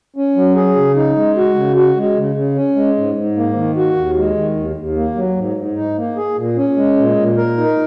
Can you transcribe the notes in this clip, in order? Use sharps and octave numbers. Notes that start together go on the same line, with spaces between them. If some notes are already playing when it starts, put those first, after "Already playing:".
C#4
F#3
G#4
C#3
D#4
G#3
F#4
C#3
F#4
G#3
C#3
C#3
C#4
G#3
G#2
G#2
A#3
D#3
F#4
D#2
G#3
D#3
D#2
D#2
A#3
F#3
G#2
G#2
D#4
A#3
G#4
A#2
C#4
G#3
A#2
A#2
A#4
D#4